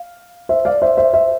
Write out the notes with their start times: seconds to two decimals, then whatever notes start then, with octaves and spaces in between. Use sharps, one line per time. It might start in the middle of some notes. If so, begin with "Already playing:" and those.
Already playing: F5
0.49 C5 E5
0.65 D5 F5
0.82 C5 E5
0.97 C5 E5
1.13 C5 E5